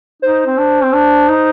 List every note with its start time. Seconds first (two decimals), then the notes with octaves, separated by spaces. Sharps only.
0.22 D#4 C5
0.47 C4
0.58 D4
0.83 C4
0.93 D4
1.29 D#4